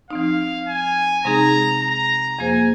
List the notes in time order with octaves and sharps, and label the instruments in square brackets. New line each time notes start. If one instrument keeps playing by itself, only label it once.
[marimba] F3 C4 D#4 [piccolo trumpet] F5
[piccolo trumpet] G#5
[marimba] C3 G#3 C4 D#4 G#4 [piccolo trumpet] A#5
[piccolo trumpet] A#5
[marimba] F2 F3 A#3 G#4 C5 [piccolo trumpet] G#5